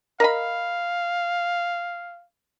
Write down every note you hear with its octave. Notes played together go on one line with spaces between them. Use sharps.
A#4 D#5 F5 B5